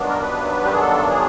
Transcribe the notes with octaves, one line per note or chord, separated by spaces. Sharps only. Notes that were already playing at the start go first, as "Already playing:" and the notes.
Already playing: G2 D#3 F#3 B3 D4
A#4
B4
G4
G#4
A4
G#4